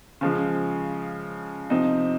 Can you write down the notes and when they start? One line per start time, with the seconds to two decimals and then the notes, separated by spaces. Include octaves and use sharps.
0.21 C#3 F3 G#3
1.70 C3 F3 C4 D#4